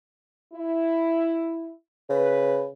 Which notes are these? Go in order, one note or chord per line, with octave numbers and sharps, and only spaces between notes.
E4
C#3 B4